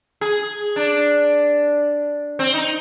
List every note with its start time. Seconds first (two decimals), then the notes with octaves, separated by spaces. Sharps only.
0.21 G#4
0.76 D4
2.39 C4
2.54 D#4